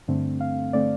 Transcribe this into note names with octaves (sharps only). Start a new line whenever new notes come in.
G2 D3 A3 C4
F5
D3 A3 C4 D5